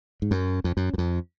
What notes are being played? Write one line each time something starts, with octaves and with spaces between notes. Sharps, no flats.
G#2
F#2
F2
F#2
F#2
F2